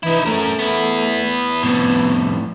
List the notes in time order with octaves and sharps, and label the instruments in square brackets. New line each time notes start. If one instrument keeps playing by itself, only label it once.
[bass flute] E3 [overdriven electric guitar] D#4 E4
[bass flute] A3 [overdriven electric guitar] C#4 A#4
[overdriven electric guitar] B3 E4
[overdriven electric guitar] F2 A2 [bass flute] B3